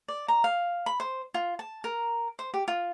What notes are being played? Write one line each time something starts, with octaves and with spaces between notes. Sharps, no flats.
D5
A#5
F5
B5
C5
F4
A5
A#4
C5
G4
F4